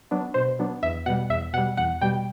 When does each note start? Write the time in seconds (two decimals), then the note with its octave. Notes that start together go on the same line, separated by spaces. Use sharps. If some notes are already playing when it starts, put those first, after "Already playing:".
0.11 F#3 B3 D4
0.34 B2 C5
0.59 F#3 B3 D4
0.83 E2 E5
1.06 B2 G3 F#5
1.30 E2 E5
1.53 B2 G3 F#5
1.77 E2 F#5
2.01 B2 G3 G5